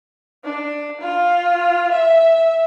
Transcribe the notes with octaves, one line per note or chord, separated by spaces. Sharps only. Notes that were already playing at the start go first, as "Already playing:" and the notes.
D4
F4
E5